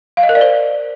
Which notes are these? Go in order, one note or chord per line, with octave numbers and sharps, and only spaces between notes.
F5
D#5
A#4
D5
C5